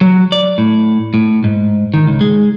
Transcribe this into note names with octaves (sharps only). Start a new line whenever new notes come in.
F#3
D5
A2
A2
G#2
D#3
C#2
G#3